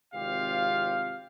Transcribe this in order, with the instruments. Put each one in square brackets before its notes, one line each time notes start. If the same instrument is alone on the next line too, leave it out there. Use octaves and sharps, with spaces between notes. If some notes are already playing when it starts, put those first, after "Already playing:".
[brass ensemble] G#1 C3 F4 G4 F5